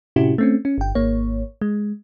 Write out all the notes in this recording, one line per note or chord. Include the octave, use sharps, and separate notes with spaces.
A2 C3 C#4 E4 F#4 G4
A3 C4 C#4
C#4
G1 G5
G#1 A#3 C#5
G#3